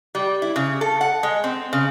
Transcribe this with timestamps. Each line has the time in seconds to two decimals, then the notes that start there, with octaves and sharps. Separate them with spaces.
0.15 G3
0.42 E4
0.56 C#3
0.81 A4
1.01 F#5
1.23 G#3
1.44 C4
1.73 C#3